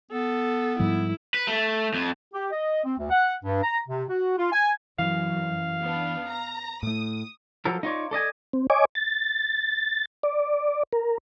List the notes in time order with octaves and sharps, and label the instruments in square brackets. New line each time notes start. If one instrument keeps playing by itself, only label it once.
[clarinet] B3 [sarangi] A4
[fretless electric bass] G#2 F3 G3 [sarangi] E4
[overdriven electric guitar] B4
A3
F2
[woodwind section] G4
D#5
C4
D2
F#5
G2
A#5
C3
F#4
F4
G#5
[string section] F#2 [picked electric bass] E3 [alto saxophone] F5
[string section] B3 D4
A#5
[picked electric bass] A2 A3 [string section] D#6
[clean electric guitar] F3 F#3 A4 A#4
D#4 F4 C#5 D5
A4 D5 D#5 G#5
[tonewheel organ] C4
C#5 D#5 G#5 D6
A6
D5
A#4